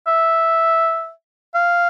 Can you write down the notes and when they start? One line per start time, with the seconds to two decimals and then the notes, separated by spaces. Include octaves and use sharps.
0.07 E5
1.54 F5